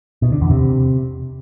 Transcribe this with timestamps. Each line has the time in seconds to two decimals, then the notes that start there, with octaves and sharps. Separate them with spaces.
0.22 B2
0.32 D3
0.41 E2
0.51 C3